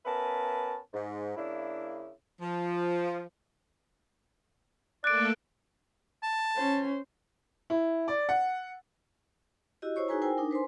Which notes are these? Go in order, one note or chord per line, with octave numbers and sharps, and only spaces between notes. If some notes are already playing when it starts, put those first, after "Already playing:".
B3 C#4 A#4 B4 E5 A5
G#2
C#3 A#3 D4 E4
F3
A3 A#3 A4 D5 F#6 D7
A5
C#4 C5
E4
D5
F#5
E4 F#4 G4 D#5
E4 C5 C#5 C#6
D#4 F#4 G#4 B4 G#5 A#5
E4 A#4 C5 G5 G#5
D4 D#4 A#4
B4 C5 G#5 C6